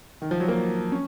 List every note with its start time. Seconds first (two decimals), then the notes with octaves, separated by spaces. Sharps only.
0.22 D#3
0.31 F3
0.40 F#3
0.48 A#3
0.92 C#4